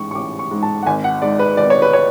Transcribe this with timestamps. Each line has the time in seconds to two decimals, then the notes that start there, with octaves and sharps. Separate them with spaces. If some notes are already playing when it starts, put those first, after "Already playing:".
Already playing: A1 G#2 C#6
0.11 C#6
0.15 A1 D6
0.39 C#6
0.51 G#2
0.63 A5
0.83 F#5
0.86 G#1 G#5
1.04 F#5
1.22 G#2 D5
1.39 B4
1.57 G#1 D5
1.70 C#5
1.82 B4
1.93 C#5